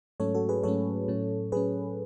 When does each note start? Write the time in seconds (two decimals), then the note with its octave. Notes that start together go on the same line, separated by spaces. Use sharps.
0.20 G#2 F#3 A3 C#4 A4 C#5
0.35 F#4 A4
0.49 G#4 B4
0.63 G#2 F#3 A3 C#4 A4 C#5
1.08 A2 F#3 C#4
1.52 A2 F#3 C#4 G#4 B4